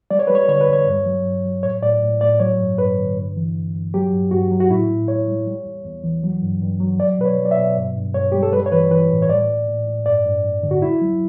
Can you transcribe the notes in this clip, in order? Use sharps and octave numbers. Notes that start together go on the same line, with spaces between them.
G3 D5
C#5
G3 B4
C#5
D3 C#5
B4
E2
C#5
G2
F#3
G2
F#3
A2 C#5
A2 D5
A2
A2 D5
F#3 C#5
G2
G2 B4
D3
G2
E3
G2
G2
F#3 G4
G2
G2 F#4
F#3
F#4
A2 E4
A2
A2 C#5
G3
G3
E2
E2
E3
F#3
G2
G2
F#3
F#3 D5
B2 B4
C#5
F#3
D5
E5
B2
G2
G2
G2 C#5
G3 G4
A4
G3 B4
C#5
E3 B4
E3 B4
A2
C#5
A2 D5
A2
A2
A2
G2 D5
G2
G2
D3
F#4
E2 E4
F#3